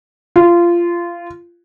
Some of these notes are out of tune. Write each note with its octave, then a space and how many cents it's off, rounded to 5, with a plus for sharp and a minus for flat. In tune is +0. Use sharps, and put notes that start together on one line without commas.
F4 -20